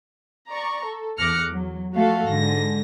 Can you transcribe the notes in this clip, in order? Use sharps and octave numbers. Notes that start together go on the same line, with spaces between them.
D5 A#5 C#6
A4
E2 D6 F6 F#6 A#6 C#7
F#3
F3 A3 F#4 A4 F5
G#2 D3 A#6